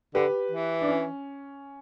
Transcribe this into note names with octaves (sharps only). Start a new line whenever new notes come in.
D3 G4 B4
E3
D4
C#4